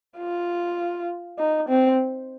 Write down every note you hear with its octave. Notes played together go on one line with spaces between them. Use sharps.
F4
D#4
C4